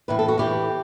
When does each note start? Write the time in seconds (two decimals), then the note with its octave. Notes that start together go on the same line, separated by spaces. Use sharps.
0.08 A2 E3 B4
0.19 A4
0.28 F#4
0.38 A2 E3 G4